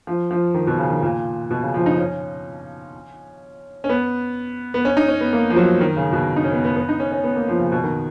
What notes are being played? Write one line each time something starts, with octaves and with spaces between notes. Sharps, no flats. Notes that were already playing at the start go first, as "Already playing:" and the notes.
F3
F3
D#3
B2
C#3
D#3
A#2
B2
C#3
F3
D#4
C#4
C#4
B3
B3
C#4
D#4
C#4
B3
A#3
F3
F#3
D#3
C#3
B2
D#4
C#4
B3
B3
B3
D#4
C#4
C#4
B3
A#3
F3
C#3
B2
D#3